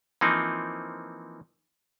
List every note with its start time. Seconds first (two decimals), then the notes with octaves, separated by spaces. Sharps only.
0.21 E3 F3 A#3 C4 D#4